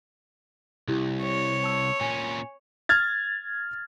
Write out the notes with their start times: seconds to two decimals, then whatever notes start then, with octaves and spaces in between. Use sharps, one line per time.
0.88 C2 E4 G4
1.23 C#5
1.64 A5 E6
2.01 A#2 C#4 G#5
2.89 F6 G#6 A6